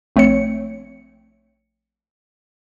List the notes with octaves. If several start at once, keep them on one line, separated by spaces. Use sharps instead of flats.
A#1 A3 C4 C#5 C#7